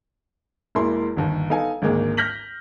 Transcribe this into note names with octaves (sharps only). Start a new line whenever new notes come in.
E1 E2 A#3 E4 C6
G1 D#2
B3 D#4 A4 F5 G#5
G#1 D2 G#3 A#3
F6 G6 A#6 B6 F#7